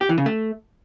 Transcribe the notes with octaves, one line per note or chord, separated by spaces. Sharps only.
G4
E3
C#3
A3